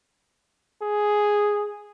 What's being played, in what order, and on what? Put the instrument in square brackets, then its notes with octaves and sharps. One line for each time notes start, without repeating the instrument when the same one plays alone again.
[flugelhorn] G#4